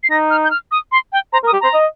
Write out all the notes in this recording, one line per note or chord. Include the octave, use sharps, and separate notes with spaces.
C7
D#4 A#6
F6
G6
F6
D#6
C6
G5
C5 A#5
A#4
D#6
G4
C5 A#5
D#5